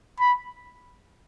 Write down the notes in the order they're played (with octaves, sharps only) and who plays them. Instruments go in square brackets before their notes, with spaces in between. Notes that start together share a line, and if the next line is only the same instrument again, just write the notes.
[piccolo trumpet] B5